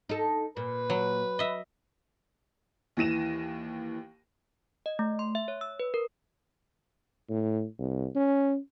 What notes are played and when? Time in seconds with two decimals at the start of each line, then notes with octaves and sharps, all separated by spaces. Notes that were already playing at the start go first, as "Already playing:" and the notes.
0.09 D#4 A4
0.57 A#2 B4
0.90 F#3
1.39 D#5 E5
2.97 D#2 E3 A#6 D#7 E7
4.86 D#5
4.99 A3
5.19 C6
5.35 E5
5.48 C#5
5.61 E6
5.80 B4
5.94 A#4
7.30 A2
7.79 C2
8.15 C#4